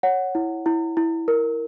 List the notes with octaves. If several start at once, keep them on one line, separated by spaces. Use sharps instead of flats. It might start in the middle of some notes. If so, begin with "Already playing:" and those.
C#5 F#5
E4
E4
E4
A#4